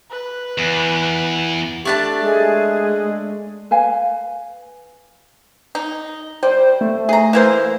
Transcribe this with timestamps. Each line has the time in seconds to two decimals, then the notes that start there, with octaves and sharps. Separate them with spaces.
0.11 B4
0.58 E2
1.85 A3 D4 G4 A5
2.23 G#3 G#4
3.71 B4 F5 G#5
5.75 D#4
6.43 G3 C5
6.81 A3
7.09 G#4 A#5
7.33 E3 A#3 C5